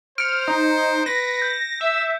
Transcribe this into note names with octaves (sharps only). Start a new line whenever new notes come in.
C5 F6 C#7 D7
D#4
B4 A#6
G6
E5 E6